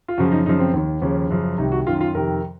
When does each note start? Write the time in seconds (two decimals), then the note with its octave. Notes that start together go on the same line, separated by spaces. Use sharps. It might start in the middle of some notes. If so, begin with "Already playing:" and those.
0.08 F4
0.18 F#2 C#3 F3 F#4
0.32 D#4
0.46 F#2 C#3 F3 D#4
0.59 C4
0.74 D#2 D#3
1.02 D#2 C#3 F3 C#4
1.30 F#2 C#3 F3
1.58 C2 C3 D#3 D#4
1.72 F#4
1.86 F#2 D#3 F4
2.01 F4
2.15 F2 C3 D#3 A#4